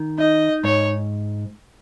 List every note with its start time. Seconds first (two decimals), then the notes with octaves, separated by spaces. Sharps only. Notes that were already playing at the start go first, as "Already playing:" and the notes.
Already playing: D#3
0.18 D#4 D#5
0.64 G#2 C#5